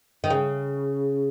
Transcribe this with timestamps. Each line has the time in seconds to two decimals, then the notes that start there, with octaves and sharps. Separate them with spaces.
0.24 D#3
0.30 C#3